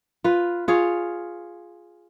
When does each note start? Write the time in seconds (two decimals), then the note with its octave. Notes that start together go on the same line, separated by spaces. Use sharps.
0.24 F4 B4
0.68 F4 G#4 C#5